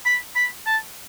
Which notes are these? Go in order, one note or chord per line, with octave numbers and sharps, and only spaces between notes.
B5
B5
A5